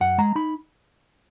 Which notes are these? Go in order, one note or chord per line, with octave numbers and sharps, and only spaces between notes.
F#2 F#5
G#3 A#5
D#4 B5